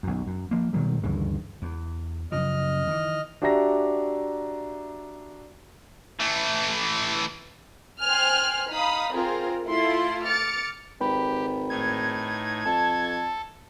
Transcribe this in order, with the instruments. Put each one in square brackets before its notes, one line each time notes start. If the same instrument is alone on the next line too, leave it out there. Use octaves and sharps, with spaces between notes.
[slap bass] B1 F#2
F#2
F3 A#3
B2 D#3 F#3 G3
D2 G2 C#3 E3
E2
[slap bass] F#2 C#3 F3 [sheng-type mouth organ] D#5 F6
[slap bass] D#3 E3
[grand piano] D4 F#4 G4 E5 A#5 A#6
[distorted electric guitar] E3 A3
[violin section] C5 G5 G#5 F6 F#6
D#4 F5 B5 D#6
C4 F4 G#4 A#4
A3 E4 F4 C6
D6 F6 A6 C#7
[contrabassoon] G#1 [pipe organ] G4 [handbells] B4 G5 B5
[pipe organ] A2 D#4 [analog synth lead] G#6
[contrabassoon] F2 [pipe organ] A4 [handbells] A5